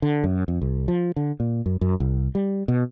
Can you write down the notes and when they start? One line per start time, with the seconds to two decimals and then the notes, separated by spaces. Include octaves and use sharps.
0.02 D3
0.24 F#2
0.48 F2
0.62 C2
0.88 F3
1.16 D3
1.40 A#2
1.66 F#2
1.81 F#2
2.00 C2
2.35 G3
2.68 B2